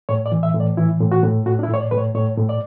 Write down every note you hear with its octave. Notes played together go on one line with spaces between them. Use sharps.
A2 C#5
D5
E3
E5
A2
D5
E3 E4
A2
F#4
A2
A2 F#4
D4
E4
A2
C#5
D5
A2 B4
C#5
A2 C#5
A2
D5